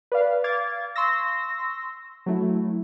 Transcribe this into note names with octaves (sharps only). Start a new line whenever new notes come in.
B4 D5 F5
F5 D6 G#6 A6
C6 C#6 E6 A#6
F#3 A3 E4